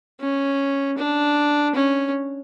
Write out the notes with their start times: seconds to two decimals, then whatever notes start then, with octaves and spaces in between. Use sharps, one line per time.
0.21 C#4
0.98 D4
1.75 C#4